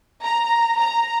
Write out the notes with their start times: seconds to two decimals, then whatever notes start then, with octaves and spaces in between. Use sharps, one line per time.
0.23 A#5
0.77 A#5